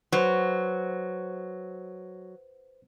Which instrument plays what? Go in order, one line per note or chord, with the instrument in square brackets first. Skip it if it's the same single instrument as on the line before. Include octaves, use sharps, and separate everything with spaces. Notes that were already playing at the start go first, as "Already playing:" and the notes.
[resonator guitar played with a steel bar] F#3 [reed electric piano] B4 C5